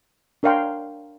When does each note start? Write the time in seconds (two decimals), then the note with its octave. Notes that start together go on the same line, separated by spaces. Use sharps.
0.43 D4 A#4 C#5 F5 G5 C6